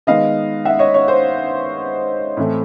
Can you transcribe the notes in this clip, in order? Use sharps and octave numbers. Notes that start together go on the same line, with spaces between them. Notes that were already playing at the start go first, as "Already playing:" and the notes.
D#3 G#3 B3 D#5 F5
E5 F#5
C#5 D#5
C#5
C5
A2 E3 A3 C4